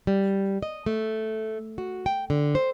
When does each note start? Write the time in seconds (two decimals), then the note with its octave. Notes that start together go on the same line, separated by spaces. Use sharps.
0.07 G3
0.63 D#5
0.86 A3
1.78 F#4
2.06 G5
2.30 D3
2.55 C5